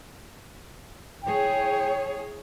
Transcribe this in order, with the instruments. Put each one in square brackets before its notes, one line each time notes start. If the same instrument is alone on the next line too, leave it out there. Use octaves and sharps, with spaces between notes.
[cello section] E4 G#4 C#5 [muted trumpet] G5